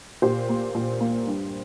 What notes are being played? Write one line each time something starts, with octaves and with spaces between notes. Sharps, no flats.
A#2 G4 C5
A#3
A#2
A#3
G2